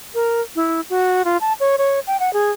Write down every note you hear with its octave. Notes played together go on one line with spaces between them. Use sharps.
A#4
E4
F#4
F4
A5
C#5
C#5
G5
F#5
G#4